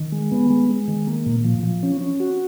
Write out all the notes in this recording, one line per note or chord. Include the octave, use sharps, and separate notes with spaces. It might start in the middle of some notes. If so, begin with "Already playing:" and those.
Already playing: D#3
G#3
B3
G#3
G#3
D#3
A#3
A#2
F3
F3
C#4
C#4
F#4